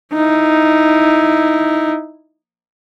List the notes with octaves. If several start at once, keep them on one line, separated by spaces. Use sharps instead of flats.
D#4 E4